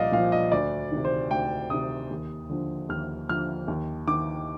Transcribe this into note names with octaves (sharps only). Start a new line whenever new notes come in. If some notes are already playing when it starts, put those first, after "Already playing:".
Already playing: C2 A#2 F3 D5 D#5 F5
A#2 F3 F5
D#5
D2 D5
C3 D#3
C5
D2 G5
C3 D#3 D#6
D#2
D3 F3
D#2 F6
D3 F3 F6
D#2
D#3 D6